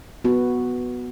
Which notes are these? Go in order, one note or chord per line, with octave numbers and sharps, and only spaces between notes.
B3 F#4